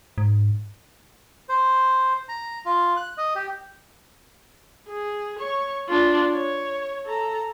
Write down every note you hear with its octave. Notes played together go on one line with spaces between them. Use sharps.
G#2
C5
A#5
F4
F#6
D#5
G4
G#4
C#5 C#6
D4 F4
C#5
A4 A#5